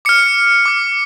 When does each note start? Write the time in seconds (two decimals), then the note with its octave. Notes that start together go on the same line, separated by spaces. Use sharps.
0.05 D6 F6 C#7
0.66 D6 F6